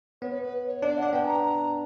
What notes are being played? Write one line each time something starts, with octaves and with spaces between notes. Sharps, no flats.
B3 C#5
B4
B4
C#5
D4 D5
D4 F#5
B3 G5
A#5